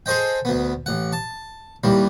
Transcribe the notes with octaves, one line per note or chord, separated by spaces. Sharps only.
G#4 A4 C5 D#5 G5
D2 B3
A1 F#5
A5
D#2 E3 G3